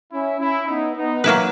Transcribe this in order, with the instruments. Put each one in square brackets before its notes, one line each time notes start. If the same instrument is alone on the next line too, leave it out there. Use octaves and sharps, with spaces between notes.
[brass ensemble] C#4 E4
C#4 E4
B3 D#4
B3 D#4
[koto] F#3 A#3 E4 B4